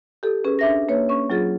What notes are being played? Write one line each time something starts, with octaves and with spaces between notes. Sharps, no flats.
G4 A4
C#4 G#4 B4
D4 E5 A#6
A#3 B4 C#5
C#4 C#6
F#3 F4 G#4 A6